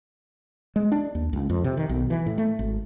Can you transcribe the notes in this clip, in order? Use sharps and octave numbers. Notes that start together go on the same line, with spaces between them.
G#3
D4
D#2
C#2
F2
C3
D#3
B1
E3
A2
A3
G#1